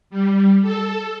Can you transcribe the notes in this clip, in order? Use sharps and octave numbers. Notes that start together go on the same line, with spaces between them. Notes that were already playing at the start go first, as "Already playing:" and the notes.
G3
A4